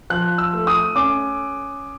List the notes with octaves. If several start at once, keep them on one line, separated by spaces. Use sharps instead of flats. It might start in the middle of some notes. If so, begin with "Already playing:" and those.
F3 F#6
E6
A3
D#6
C#4 D6